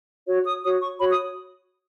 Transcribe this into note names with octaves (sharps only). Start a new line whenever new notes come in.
F#4 C#5
D#6
F#4 C#5 D#6
C#6
F#4 C#5 B5
D#6